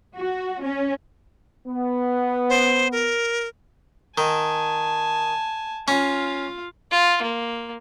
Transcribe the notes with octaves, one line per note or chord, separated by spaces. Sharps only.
F#4
C#4
B3
C5
A#4
D#3 G#5 A5
C#4 F4 F5
F4
A#3